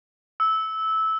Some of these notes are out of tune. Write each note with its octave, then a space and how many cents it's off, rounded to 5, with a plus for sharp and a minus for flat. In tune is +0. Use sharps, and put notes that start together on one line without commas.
E6 -15